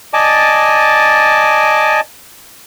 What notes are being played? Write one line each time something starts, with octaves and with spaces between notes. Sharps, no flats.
D5 D#5 G#5 A5 D6